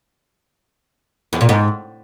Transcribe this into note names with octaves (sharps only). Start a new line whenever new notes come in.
E2
A#2
G#2